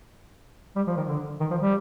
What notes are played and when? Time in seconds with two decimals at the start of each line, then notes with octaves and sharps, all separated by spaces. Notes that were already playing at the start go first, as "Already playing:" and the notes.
0.76 G3
0.87 F3
0.97 D#3
1.08 D3
1.40 D#3
1.51 F3
1.61 G3